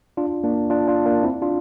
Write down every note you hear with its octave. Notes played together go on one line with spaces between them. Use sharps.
D4 F4
A#3 D4
D4 F4
D4 F4
A#3 D4
C4 E4
D4 F4